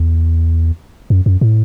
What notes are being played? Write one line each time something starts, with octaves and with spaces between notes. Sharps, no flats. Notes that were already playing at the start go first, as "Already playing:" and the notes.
Already playing: E2
F#2
F#2
A2